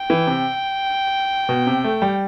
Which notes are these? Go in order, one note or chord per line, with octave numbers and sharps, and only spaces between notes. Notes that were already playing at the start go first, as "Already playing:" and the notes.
Already playing: G5
E3
C3
B2
C3
A3
G3